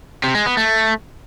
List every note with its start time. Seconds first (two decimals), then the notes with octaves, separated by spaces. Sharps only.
0.24 C3
0.35 G#3
0.46 B3
0.57 A3